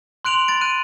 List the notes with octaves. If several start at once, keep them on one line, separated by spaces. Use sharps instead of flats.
C6 F#6 D7 F7 F#7
B5 A6 D7
F#6 D#7